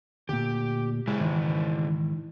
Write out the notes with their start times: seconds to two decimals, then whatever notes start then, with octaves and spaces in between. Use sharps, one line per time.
0.29 D2 A#2 G4
1.07 C#3 G#3 E4
1.20 G#2 D#3 E3